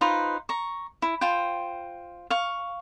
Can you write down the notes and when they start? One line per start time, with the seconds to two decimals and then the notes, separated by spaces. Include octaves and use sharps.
0.01 D#4 F4 B4 C5
0.49 A#5 C#6
1.02 E4
1.21 F4 C5 G5
2.30 F5 C#6